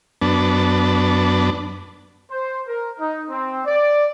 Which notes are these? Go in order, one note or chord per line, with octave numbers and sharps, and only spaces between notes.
F#2 B3 D4 A5
C5
A#4
D#4
C4
D5